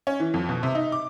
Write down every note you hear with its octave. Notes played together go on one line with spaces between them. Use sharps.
C#4
E3
F2
B2
C3
D#4
D6